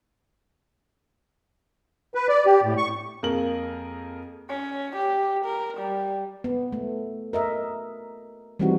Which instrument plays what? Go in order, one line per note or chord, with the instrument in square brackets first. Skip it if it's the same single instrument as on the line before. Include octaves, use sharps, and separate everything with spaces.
[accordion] B4
D5
G4
A2
C#6
[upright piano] F2 A#3 G#4 A#4 F#7
[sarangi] C#4
G4
A#4
G3
[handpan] B3
A3
A#4 D#5 E5
E3 G3 A3 C4 D#4 F#4